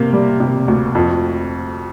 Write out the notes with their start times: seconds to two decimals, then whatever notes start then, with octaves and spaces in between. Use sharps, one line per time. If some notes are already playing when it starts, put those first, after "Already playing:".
Already playing: C3 A#3
0.13 G3
0.40 C3
0.68 D2
0.95 F2